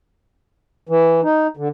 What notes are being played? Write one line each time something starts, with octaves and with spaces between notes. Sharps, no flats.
E3
D#4
D3